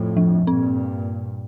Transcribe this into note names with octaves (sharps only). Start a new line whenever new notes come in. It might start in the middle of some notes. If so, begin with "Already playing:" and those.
Already playing: F2 A2
F3
G2 A#2 C4